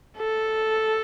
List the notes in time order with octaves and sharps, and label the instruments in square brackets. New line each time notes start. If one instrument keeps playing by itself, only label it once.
[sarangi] A4